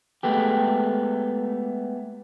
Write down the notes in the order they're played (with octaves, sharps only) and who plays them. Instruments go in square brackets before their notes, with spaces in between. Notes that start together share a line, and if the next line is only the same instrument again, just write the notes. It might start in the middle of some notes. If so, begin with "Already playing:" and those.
[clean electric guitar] G#3 A3 B3 G4